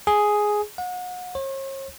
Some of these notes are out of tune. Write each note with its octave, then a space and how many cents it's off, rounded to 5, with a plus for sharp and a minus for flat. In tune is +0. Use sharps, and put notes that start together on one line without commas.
G#4 +5
F#5 -35
C#5 -45